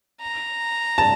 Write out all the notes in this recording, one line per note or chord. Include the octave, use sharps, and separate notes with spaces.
A#5
A5